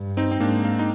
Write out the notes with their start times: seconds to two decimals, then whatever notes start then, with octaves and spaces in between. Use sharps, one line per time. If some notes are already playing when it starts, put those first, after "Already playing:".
Already playing: G2
0.17 C4 D#4
0.31 C4
0.40 G#2 A#3 D4
0.65 A#3
0.79 D#4